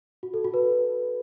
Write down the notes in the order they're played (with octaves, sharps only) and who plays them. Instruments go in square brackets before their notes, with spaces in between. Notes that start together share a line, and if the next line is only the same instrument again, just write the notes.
[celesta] F#4
A4
F#4
B4